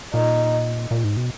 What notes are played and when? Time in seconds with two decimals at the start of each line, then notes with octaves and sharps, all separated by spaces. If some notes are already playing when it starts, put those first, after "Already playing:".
0.14 A#2 D#4
0.91 A#2
1.04 G#2
1.17 B2